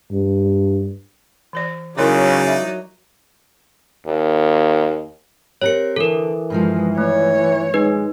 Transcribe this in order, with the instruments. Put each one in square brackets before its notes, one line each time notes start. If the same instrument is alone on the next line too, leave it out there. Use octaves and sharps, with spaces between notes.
[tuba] G2
[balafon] E3 C5 D5
[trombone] C#3 [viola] F#3 [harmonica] D#4 D5 [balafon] E4 A#4 C#5
[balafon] E5
[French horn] D#2
[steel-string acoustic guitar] C4 G4 A#4 [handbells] C#5 C#7
[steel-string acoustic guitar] D3 [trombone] E3 [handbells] A4 A#4
[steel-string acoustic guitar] G2 D#3 F3 [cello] G#3
[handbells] A3 [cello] C#5
[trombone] G#3 [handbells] D#4 B4